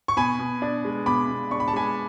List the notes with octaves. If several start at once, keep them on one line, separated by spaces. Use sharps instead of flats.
C#6
B2 G#5 B5
B2
D4
G#3
B2 B5 D6
B2
D4 C#6
B5
A5
G#3 G#5 B5